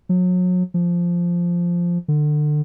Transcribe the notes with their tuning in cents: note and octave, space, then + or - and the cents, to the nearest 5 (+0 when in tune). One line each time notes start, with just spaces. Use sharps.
F#3 -35
F3 -5
D3 +30